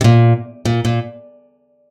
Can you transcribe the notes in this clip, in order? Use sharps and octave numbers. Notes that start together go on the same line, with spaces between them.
C3
A#2
A#2
A#2